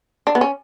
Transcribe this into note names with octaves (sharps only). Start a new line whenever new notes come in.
D4
B3
C#4